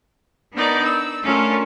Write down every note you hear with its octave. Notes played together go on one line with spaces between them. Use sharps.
B3 D4 D#4 A#4 D5
E6
A3 C#4 D4 F4 A4 A#4